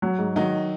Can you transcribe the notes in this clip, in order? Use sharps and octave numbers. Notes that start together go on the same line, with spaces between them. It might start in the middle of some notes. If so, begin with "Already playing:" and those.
F#3
G#2
D#3 F#3 D#4